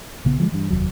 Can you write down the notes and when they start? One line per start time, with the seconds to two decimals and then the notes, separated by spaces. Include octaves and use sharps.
0.25 A#1 C#3 B3
0.38 D3 F3 G3 G#3
0.52 G2 E3
0.70 F1 D#2 F#3